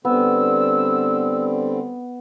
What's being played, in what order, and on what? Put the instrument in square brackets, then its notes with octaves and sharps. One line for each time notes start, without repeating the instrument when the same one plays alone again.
[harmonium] D3 G3 C4 [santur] B3 [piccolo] E6